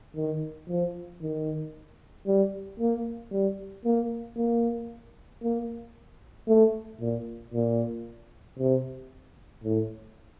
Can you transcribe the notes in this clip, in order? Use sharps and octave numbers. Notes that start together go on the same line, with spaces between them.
D#3
F3
D#3
G3
A#3
G3
A#3
A#3
A#3
A3
A#2
A#2
C3
A2